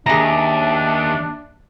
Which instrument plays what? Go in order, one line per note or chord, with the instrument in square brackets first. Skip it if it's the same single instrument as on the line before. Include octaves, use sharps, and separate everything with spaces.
[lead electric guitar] D#2 [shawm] D4 [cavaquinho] G#4 A#5 [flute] E5